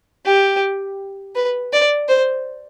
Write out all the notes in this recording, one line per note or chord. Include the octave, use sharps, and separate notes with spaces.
G4
B4
D5
C5